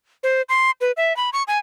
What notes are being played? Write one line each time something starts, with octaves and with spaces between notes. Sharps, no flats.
C5
C6
B4
E5
B5
C#6
G#5